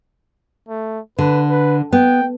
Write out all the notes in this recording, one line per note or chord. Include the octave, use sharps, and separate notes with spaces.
A3
D3 B4
B4
B3 G5